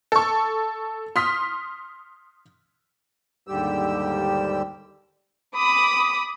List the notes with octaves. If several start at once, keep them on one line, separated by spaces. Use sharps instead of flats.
A4 C#6
C6 D#6 F6 B6
D#2 G#2 D3 G3 G4 E6
B5 D6 D#6